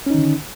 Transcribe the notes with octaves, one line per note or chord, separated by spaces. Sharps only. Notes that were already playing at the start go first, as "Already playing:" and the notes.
D3 D#3 C#4 D#4